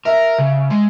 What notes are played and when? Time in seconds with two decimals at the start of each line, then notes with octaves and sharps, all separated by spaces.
0.05 A#4 E5
0.38 C#3
0.70 G#3